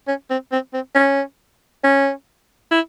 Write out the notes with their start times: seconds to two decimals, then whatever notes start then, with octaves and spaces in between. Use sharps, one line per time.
0.08 C#4
0.30 C4
0.52 C4
0.74 C4
0.95 C#4
1.84 C#4
2.71 E4